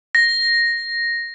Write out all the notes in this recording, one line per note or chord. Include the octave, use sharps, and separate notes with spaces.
A#6